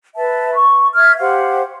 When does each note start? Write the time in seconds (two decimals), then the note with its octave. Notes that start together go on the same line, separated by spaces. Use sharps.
0.15 B4 E5 A5
0.55 C#6
0.95 E5 F6 G#6
1.18 G4 C5 F5 F#5